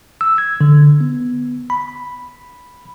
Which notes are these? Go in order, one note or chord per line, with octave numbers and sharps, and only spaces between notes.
E6
G#6
D3
B3
B5